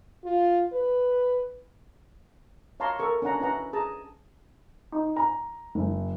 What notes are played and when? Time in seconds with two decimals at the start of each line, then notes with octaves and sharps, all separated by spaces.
0.24 F4
0.73 B4
2.80 C#5 F5 A5 A#5 C6 D6
2.99 A4 A#4 C#6
3.22 C#4 D4 F#5 A#5
3.40 C#4 E4 B4 F#5 A#5
3.73 G#4 A5 A#5
4.92 D#4
5.16 A#5
5.75 F#1